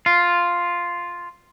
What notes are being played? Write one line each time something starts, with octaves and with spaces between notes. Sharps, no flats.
F4